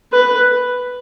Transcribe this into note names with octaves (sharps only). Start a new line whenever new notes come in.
B4